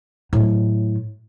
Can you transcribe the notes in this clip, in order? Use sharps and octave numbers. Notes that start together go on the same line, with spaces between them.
A2 F#3